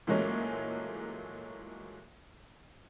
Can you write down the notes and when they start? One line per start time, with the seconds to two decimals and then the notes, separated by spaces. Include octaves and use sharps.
0.07 A#2 E3 F#3 G#3 A3 C#4